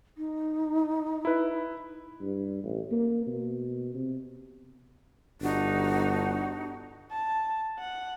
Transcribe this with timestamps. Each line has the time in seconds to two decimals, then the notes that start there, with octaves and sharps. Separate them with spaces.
0.17 D#4
1.25 E4 B4
2.21 G2
2.63 A1
2.92 A#3
3.27 B2
3.94 C3
5.41 G1 D4 D#4 F#4
7.11 A5
7.79 F#5